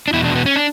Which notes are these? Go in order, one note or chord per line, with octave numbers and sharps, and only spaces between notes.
D4
E2 B2 E4
D4
B3
C#4
D4